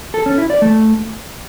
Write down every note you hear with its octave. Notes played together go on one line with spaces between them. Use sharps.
A4
C#4
E4
D5
A3